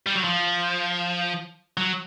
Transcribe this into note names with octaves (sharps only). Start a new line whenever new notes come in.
G3
F#3
F3
F#3